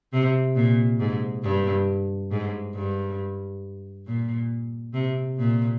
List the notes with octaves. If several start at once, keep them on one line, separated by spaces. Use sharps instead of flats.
C3
A#2
G#2
G2
G#2
G2
A#2
C3
A#2